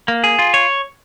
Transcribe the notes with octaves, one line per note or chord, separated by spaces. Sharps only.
A#3
G#4
F4
C#5